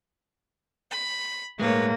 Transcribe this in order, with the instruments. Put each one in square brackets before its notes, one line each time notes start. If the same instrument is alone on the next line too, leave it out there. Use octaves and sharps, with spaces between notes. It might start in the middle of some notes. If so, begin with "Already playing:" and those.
[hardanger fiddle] B5
[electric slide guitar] A2 G#3 [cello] A#3 [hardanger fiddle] B4 C#5